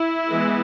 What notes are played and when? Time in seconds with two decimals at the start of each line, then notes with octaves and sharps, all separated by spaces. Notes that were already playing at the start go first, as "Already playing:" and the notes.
Already playing: E4
0.29 E3 G#3 B3